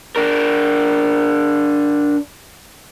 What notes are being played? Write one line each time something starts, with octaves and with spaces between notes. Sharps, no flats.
D4 A#4